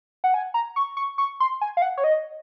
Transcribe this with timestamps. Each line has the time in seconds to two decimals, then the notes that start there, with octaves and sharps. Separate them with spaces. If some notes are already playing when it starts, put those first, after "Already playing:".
0.24 F#5
0.34 G#5
0.54 A#5
0.76 C#6
0.97 C#6
1.18 C#6
1.40 C6
1.61 G#5
1.77 F5
1.82 F#5
1.97 C#5
2.04 D#5